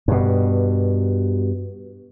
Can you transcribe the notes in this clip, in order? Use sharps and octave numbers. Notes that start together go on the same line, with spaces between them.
G2 B2